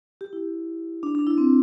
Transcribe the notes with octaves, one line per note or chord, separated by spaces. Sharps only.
G4
E4
D4
D4
E4
C4